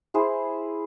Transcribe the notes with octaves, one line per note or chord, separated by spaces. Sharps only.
E4 G#4 C5